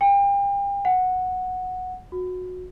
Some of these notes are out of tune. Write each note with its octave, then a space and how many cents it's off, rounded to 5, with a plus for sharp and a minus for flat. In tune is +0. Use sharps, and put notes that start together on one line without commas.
G5 +35
F#5 -5
F#4 -20